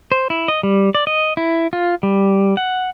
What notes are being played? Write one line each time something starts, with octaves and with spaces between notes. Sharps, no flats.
C5
E4
D#5
G3
D5
D#5
E4
F4
G3
F#5